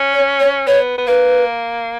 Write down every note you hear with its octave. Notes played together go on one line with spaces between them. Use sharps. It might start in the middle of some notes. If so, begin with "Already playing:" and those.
Already playing: C#4
C#5
C#5
B3 C#5
B3
A#3 B4